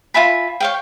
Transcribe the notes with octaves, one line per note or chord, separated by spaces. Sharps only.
F4 E5 G#5 B5
C#5 F5 G5